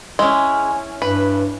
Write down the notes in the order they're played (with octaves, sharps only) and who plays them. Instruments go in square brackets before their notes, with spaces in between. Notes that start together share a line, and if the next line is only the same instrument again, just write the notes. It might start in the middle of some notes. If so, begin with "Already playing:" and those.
[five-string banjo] G#3 [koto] C#4 E4
[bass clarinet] G2 [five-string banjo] B4